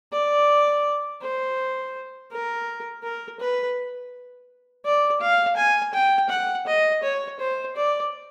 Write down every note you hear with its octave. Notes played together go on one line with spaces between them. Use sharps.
D5
C5
A#4
A#4
B4
D5
F5
G#5
G5
F#5
D#5
C#5
C5
D5